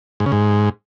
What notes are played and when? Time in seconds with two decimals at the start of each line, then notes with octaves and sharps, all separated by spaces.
0.20 G#2
0.26 C#3
0.32 G#2